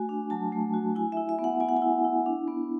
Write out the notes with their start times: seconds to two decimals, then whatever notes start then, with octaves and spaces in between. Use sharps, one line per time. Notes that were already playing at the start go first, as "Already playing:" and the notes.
Already playing: A3 F#4 G#5
0.09 D4
0.30 F#3 A5
0.52 A3
0.74 F#4
0.95 E4 G#5
1.12 E5
1.17 E4
1.29 E5
1.39 B3
1.44 F#5
1.60 B3 G#5
1.69 F#5
1.77 G#5
1.82 E4
2.04 E4
2.26 D4
2.48 B3